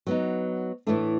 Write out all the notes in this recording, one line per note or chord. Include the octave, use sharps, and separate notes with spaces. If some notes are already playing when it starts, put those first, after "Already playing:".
F#3 B3 D#4
A2 E3 A3 D4